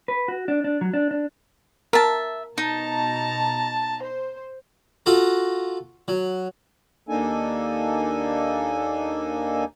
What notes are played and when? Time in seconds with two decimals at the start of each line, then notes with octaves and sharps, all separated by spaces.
0.08 B4
0.28 F#4
0.48 D4
0.64 D4
0.81 F#3
0.94 D4
1.11 D4
1.93 A#4 E5 A5
2.58 B2 D#4 A5 A#5
4.03 C5
5.06 F4 F#4 A4 A#5
6.08 F#3
7.09 D#2 A#3 D4 D#4 A4 G#5